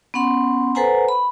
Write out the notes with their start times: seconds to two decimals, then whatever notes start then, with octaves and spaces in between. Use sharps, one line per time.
0.14 B3 C#4 F#5 C6
0.75 A4 B4 C5 F#5 G#5 A#5
1.09 B5